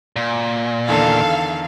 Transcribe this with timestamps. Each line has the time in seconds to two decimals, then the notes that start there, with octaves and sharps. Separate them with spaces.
0.16 A#2
0.88 E2 D3 D#3 A4 F5